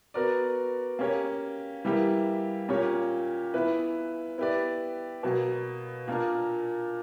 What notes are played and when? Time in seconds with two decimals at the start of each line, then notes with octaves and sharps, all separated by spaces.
0.14 B3 F#4 A#4 D5
0.99 A#3 C#4 G4 C#5
1.85 E3 G3 A#3 E4 G4
2.69 A#2 A#3 C#4 G4 C#5
3.54 E3 B3 E4 B4
4.38 B3 E4 G4 B4 D5
5.23 B2 F#3 A#3
6.07 A#2 A#3 D4 A#4